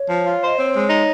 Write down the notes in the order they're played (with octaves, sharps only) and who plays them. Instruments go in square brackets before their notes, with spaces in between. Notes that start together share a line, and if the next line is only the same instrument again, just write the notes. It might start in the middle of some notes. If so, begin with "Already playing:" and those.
Already playing: [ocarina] C#5
[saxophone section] F3
F4
[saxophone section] C5 [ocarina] D#5
[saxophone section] C4 [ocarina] C#5
[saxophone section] G#3
D#4